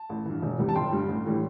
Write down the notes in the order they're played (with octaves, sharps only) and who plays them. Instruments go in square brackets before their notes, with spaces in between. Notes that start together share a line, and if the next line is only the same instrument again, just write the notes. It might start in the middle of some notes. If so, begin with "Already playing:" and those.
Already playing: [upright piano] A5
A1
G2 E3
E1
E2 C3 E3 G3
A5
G1 G5 C6
G2 G3
A1
A2 E3 G3